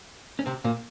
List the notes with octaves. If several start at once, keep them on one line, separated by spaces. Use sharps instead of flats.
C#4
C3 C4
A#2 A#3